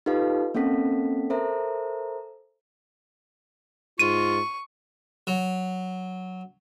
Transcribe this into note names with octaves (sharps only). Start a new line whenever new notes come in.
D#4 F4 G4 A4 B4 F5
A#3 C4 C#4 A4 B6
A4 A#4 C5 E5 A#5
G#2 F4 C#6 D#7
F#3